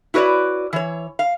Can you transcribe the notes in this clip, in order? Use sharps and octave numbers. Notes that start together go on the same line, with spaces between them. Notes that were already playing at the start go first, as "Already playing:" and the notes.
E4 F#4 B4 C#5 D5
E3 C#5
F5